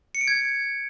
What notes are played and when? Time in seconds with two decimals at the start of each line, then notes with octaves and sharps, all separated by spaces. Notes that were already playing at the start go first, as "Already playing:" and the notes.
0.15 C#7
0.21 D7
0.28 G#6